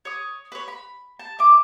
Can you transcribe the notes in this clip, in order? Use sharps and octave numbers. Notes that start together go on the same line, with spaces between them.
C#5 D#6
B4 C#5
B5
A5
E5 D6